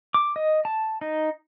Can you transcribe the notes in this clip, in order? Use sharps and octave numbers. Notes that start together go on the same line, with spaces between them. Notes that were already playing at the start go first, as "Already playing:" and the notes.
D6
D#5
A5
D#4